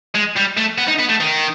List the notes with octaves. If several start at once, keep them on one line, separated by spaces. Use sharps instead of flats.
G#3
G3
A3
B3
D#4
B3
A3
D#3